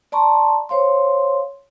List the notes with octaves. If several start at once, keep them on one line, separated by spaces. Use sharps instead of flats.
D5 A5 A#5 C6 C#6
C5 C#5 F5 C6